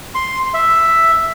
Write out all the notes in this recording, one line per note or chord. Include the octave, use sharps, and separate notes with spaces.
C6
E5